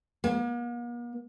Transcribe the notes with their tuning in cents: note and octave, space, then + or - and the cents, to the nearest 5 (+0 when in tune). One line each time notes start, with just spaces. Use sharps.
A#3 +45